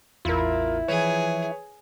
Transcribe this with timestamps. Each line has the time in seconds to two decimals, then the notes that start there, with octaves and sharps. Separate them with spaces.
0.25 A1 E2 E4 F4 A#4
0.88 E3 F3 G#4 B4 C#5